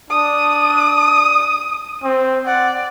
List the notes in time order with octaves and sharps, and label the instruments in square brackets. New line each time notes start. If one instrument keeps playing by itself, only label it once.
[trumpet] D4 [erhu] D#6
[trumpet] C4
[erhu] D5 [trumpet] F#5